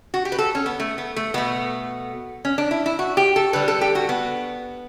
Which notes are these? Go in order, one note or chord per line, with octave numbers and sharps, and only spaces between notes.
F#4
G4
B4
A4
C#4
B3
A3
B3
A3
B2 A3 B3
C#4
D4
E4
E4
F#4
G4
A4
D3 G3 B4
A4
G4
F#4
B3